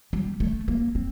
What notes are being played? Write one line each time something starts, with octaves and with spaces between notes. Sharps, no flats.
G3
A3
A#3
C4